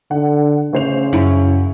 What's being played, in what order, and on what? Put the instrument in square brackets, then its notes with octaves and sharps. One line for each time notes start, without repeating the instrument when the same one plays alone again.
[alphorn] D3 [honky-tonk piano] F#5
[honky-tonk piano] A1 C5 F7 [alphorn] C#3
[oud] F#2 [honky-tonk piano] E4